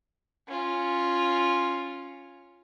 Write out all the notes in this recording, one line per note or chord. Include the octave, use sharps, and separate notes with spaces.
C#4 F4